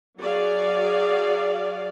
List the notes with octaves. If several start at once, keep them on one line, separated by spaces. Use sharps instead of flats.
F#3 F#4 G#4 D5 F5